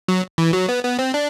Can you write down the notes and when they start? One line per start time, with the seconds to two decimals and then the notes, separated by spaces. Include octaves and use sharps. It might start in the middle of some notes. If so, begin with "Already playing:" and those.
0.08 F#3
0.38 E3
0.53 F#3
0.69 B3
0.84 B3
0.99 C4
1.14 D4